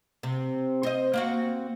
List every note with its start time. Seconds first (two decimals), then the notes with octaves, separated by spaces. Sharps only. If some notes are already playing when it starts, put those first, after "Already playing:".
0.23 C3
0.83 C5 D#5
1.14 A#3 C4 F#4